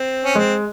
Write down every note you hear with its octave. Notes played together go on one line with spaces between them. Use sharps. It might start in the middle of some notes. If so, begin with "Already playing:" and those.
Already playing: C4
C#4
G#3 C4